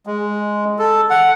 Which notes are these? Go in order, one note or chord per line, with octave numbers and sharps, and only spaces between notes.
G#3
A4
F#5